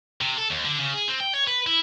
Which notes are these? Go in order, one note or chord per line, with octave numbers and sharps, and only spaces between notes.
C3
A4
D#2
D3
C#3
G#4
C4
G5
C#5
B4
E4